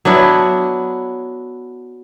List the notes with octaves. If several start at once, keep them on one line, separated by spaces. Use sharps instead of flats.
F#3 B3 D4 E4